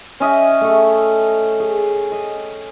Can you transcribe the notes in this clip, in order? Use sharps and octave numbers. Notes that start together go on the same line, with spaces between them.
C#4 D#5 E5 G5
A3 A4
G#4
D#5